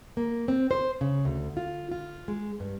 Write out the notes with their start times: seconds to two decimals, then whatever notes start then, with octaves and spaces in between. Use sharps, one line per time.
0.17 A#3
0.48 C4
0.71 C5
1.01 C#3
1.25 D2
1.57 F4
1.91 F4
2.28 G#3
2.60 G2